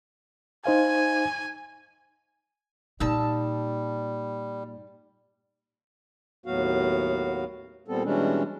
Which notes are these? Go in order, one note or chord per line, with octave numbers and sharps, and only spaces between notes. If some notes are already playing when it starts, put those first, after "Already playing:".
D#4 C5 F5 G#5
A#2 G3 D#4 A5 E6
D#2 A2 F#3 B3 F#4 F5
A#2 G3 B3 C4 A4
B2 E3 G3 G#3 C#4 D4